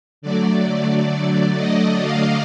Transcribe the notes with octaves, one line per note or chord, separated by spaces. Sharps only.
D3 F#3 A3 D5
D5
D#5
F5